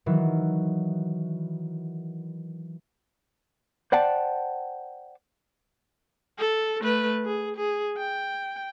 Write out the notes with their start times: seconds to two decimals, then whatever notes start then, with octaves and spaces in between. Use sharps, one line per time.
0.06 D#3 E3 F#3
3.92 C5 D5 F#5 G5 A5
6.38 A4
6.81 A3 B4
7.25 G#4
7.56 G#4
7.97 G5